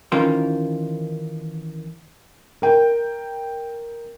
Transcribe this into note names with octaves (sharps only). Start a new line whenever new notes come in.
D#3 E3 C#4 F4 A#4 C5
A#4 G5